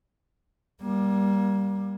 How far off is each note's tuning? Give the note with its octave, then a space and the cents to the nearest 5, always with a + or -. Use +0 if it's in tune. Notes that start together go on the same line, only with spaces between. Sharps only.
G3 +0 A#3 +30